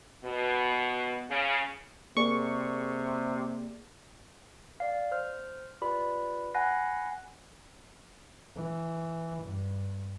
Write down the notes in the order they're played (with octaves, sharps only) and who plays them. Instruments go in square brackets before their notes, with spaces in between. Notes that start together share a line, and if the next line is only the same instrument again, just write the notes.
[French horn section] B2
C#3
[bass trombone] C3 [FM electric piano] A#3 G#4 D5 [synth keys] C#6
[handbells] D5 F5
C5 F6
F4 G4 B4 D5 B5
F#5 G#5 B5 F#6 A#6 C7
[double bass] E3
G2